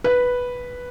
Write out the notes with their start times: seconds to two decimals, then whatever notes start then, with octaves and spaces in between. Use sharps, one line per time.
0.04 B4